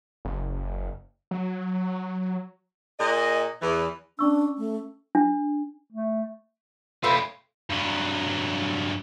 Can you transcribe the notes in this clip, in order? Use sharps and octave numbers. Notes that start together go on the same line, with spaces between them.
F#1
F#3
A#2 G#4 D#5
E2 E3
C#4 D4 C#6 E6
A3
D4
A3
A3 E4 F4 B4 C5
G2 F#3